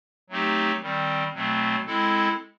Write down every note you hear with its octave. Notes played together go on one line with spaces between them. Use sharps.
F#3 A3 C4 D#4 G4
D#3 G3 C4
B2 F#3 A3 C4
G#3 C4 E4 A4